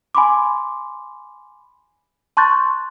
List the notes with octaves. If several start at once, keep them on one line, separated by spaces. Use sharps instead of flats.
G#5 B5 C6 D6
A5 C6 C#6 F#6 G6 A6